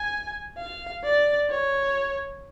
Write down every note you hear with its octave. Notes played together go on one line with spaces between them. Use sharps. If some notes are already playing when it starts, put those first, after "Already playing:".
Already playing: G#5
F5
D5
C#5